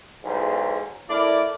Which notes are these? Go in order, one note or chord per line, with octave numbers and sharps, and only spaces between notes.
B1 E2 G#2
A3 E4 A#4 D5